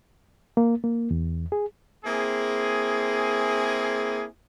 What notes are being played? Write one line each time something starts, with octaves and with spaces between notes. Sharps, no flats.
A#3
A#3
E2
G#4
A#3 C4 E4 G#4